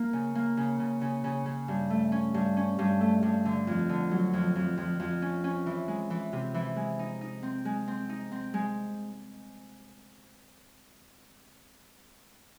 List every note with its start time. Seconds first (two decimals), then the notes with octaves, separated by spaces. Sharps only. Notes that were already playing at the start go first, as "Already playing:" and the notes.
Already playing: A#3
0.13 C#3
0.35 A#3
0.57 C#3
0.80 C#3
1.01 C#3
1.24 C#3
1.46 C#3
1.68 G2
1.90 A3
2.12 C#4
2.34 G2
2.56 C#4
2.79 G2
3.00 A3
3.23 G2
3.45 D3
3.67 F2
3.89 D3
4.11 F#3
4.33 F2
4.55 F2
4.77 F2
5.00 F2
5.22 C#4
5.44 C#4
5.66 E3
5.88 G#3
6.10 E3
6.32 C3
6.54 E3
6.76 G#3
6.99 D#4
7.21 D#4
7.43 C4
7.65 G#3
7.88 C4
8.09 D#4
8.32 C4
8.54 G#3